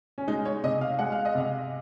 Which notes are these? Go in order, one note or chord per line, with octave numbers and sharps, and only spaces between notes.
C#4
G#3 D#4
C#5
C3 D#5
F5
G#3 F#5
F5
D#5
C3 F5